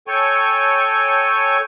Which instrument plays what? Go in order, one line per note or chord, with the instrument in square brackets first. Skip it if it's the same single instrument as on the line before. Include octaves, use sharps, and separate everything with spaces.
[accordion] A4 C#5 G5 G#5 C#6